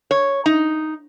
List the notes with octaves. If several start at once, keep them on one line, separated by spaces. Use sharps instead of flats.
C#5
D#4